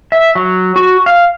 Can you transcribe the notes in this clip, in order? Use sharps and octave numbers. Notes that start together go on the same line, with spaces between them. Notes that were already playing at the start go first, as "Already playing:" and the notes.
E5
F#3
F#4
F5